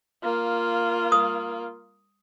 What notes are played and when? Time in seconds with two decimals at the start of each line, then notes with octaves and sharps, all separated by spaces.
0.23 A#3 F4
1.12 D#6